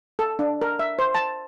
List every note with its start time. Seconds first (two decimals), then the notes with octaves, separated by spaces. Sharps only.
0.19 A4
0.39 D4
0.62 A#4
0.79 E5
0.99 C5
1.15 A5